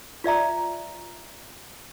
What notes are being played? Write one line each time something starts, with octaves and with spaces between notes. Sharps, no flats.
F4 D5 E5 A#5